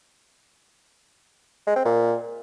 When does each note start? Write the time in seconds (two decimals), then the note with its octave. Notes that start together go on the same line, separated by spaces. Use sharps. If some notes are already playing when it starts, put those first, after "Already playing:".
1.67 G#3
1.76 C4
1.85 A#2